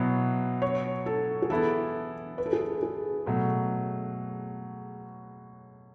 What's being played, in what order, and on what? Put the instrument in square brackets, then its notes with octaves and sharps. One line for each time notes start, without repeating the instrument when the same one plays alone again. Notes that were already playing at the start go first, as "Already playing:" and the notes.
Already playing: [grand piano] B2 F#3 B3 E4
[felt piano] C#5
A4
G#4
[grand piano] E3 B3 E4 [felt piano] A4
[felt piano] B4
A4
G#4
A4
G#4
[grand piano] B2 F#3 A3